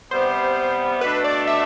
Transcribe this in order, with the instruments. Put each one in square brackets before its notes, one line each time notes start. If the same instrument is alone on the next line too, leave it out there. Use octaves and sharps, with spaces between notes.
[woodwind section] C3 G3 B3 [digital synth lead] C5
[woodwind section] B2 A3 D4 [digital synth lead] B4
[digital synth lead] D5
E5